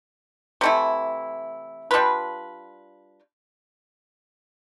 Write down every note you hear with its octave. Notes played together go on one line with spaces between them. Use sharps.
C3 E3 A3 E4
G3 D4 F4 B4